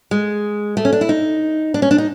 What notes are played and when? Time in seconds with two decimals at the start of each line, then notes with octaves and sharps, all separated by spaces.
0.11 G#3
0.77 A3
0.85 C#4
0.93 D4
1.01 E4
1.09 D#4
1.74 D4
1.82 C#4
1.91 D4
1.98 D#4